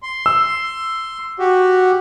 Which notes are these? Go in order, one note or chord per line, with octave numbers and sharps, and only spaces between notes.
C6
E6
F#4 G4